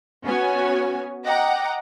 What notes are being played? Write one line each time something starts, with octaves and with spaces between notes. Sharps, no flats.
B3 C#4 F#4 C#5 G#5
D#5 F#5 G5 A#5 D6